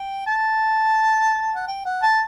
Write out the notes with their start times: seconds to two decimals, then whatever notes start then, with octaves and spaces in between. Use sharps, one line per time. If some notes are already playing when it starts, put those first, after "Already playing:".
Already playing: G5
0.27 A5
1.55 F#5
1.68 G5
1.85 F#5
2.03 A5